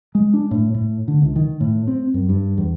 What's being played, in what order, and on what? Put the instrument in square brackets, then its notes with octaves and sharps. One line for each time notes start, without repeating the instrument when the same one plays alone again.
[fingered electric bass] G#3
D4
A2
A2
D3
C#2
D#3
A2
C4
F#2
G2
E2